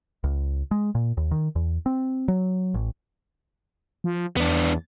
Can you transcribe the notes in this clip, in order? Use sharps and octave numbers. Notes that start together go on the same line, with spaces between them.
C#2
G#3
A#2
D#2
D#3
E2
C4
F#3
A1
F3
E2 B3 D4